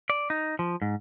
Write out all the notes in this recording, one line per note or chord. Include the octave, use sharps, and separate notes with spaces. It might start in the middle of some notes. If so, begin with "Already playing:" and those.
D5
D#4
F3
G#2